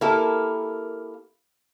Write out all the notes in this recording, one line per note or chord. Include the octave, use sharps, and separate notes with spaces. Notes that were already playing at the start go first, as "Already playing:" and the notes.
A#3 E4 G4 A4 A#4